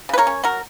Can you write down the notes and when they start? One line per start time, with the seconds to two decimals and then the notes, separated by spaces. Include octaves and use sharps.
0.09 C#3 B4
0.18 A#4 C#5
0.27 C#4
0.43 F#3 F#4 A#4